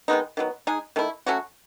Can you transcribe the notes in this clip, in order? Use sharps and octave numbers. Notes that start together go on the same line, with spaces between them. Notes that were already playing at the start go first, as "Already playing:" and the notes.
D#3 G#3 B3 D#4
D#3 F#3 B3
G#3 D#4 G#4
D#3 A3 E4
F#3 A3 C#4 F#4